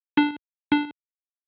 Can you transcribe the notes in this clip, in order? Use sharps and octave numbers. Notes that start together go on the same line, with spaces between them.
D4
D4